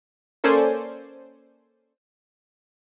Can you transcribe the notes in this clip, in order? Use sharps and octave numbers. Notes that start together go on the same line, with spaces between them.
A#3 C#4 A4 C5 D5 G#5